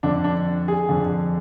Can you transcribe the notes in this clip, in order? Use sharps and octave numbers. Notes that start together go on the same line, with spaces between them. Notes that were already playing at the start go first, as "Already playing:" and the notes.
F2 D3 D4
D4
G#4
F2 D3